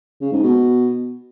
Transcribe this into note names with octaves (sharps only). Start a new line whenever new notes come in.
C#3
G#2
B2